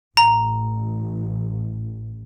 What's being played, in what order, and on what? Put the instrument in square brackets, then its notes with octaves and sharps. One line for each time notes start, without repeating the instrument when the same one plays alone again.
[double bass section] A1 [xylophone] A#5